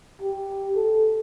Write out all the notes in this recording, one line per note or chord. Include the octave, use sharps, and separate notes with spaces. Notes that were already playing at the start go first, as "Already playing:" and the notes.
G4
A4